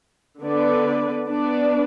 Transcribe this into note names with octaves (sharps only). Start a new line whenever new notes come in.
D3 B3 D4 B4 D5
B3 D4 B4 D5